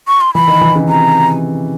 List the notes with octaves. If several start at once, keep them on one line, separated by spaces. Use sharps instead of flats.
C#6
C6
E3 B5
D#3
E3
C#3
C3 A#5